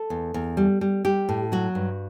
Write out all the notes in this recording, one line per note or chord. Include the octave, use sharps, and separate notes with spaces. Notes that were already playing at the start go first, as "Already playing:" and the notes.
Already playing: A4
E2
E2
G3
G3
G3 G4
A2
F#3 F#4
G2